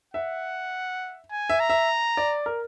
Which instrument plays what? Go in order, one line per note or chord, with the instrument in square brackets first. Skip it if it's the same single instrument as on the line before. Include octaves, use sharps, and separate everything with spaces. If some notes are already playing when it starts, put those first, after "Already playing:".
[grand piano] E5 [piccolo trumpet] F#5
[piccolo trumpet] G#5
[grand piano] E5
[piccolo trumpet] A#5
[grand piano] E5
D5
A#4